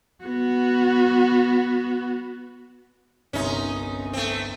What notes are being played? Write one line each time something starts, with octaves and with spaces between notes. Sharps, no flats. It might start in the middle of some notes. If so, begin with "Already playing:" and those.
B3 F#4
G1 C2 C#4 D#4 C6
A3 C4